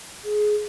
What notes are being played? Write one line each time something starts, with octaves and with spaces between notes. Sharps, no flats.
G#4